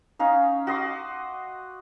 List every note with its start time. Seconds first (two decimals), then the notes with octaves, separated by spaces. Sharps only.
0.19 C#4 D#4 F5
0.67 F#4 D#5 C6 D6